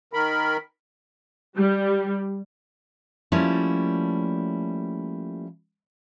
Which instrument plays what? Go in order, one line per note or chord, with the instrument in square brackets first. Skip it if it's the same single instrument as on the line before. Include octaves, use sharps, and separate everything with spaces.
[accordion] D#3 A#4 B5
[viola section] G3
[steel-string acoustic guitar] F3 G3 A3 A#3 C#4 E4